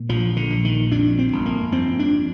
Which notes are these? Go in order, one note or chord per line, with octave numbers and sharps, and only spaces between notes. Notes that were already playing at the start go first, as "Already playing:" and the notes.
Already playing: A#2
A#1 F3
D3
A#1
D#3
F2 D4
C4
G1
A#3
F2 C4
D4